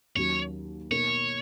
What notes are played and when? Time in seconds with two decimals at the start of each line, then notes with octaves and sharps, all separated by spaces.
0.16 D#2 D#3 F#3 C#4 F#4 C#5
0.91 B2 A#3 D#4 C#5